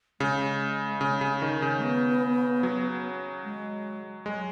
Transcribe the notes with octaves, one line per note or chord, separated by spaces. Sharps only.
C#3 G#3
C#3
C#3
D#3
C#3
G#3
B3
F#3
G#3
F#3 G#3